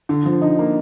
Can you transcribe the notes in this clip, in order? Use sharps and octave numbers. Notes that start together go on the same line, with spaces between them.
D3
F3
D#4
A#3